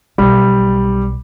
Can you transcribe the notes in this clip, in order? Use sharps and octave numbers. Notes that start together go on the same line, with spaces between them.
B1 G3